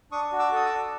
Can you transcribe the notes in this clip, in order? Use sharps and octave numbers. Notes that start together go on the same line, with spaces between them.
D4 C#6 D#6
F#4
D6 E6
A4 D#6
D6 E6
D4